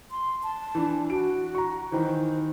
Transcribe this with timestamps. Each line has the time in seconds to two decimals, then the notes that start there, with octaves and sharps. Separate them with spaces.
0.11 C6
0.43 A5
0.75 E3 D4
1.10 F#4 D7
1.55 A#5 C#6
1.92 D#3 E3 C5